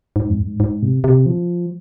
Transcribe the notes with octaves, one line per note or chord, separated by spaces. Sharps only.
G#2
F2
G#2
G#2
C3
C3
F3